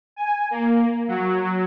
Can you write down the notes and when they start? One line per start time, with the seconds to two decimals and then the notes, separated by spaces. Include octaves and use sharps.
0.16 G#5
0.51 A#3
1.08 F#3